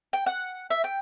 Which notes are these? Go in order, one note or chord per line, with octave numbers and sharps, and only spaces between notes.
G5
F#5
E5
G5